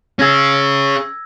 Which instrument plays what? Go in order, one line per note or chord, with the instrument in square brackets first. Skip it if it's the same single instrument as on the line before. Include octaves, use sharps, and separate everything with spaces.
[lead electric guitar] C#4 G#4 [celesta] E6 G#6 A#6